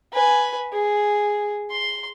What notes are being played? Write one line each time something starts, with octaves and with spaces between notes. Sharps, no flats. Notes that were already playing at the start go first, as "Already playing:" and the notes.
B4 G#5
G#4
C6